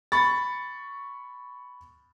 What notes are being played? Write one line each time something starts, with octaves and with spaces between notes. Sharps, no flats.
B5 C#6 A6